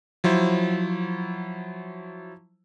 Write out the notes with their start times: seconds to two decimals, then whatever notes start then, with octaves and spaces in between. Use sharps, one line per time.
0.24 F3 F#3 E4 C5